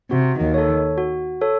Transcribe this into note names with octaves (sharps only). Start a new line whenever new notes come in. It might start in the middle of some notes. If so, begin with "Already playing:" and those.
C3 F#4
D#2 D#3
A4 C#5
F#4
A4 C#5